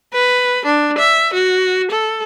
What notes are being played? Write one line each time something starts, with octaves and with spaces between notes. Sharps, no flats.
B4
D4
E5
F#4
A4